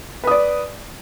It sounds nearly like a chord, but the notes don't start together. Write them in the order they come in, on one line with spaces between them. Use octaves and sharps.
B4 D#6 D5